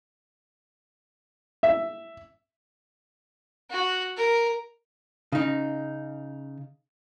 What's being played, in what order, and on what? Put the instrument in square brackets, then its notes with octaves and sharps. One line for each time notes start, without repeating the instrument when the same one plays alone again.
[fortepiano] E5
[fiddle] F#4
A#4
[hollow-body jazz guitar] C#3 D#4